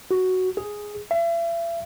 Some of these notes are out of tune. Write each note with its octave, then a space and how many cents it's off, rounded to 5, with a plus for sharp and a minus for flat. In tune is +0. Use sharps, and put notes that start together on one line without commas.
F#4 +5
G#4 +0
E5 +40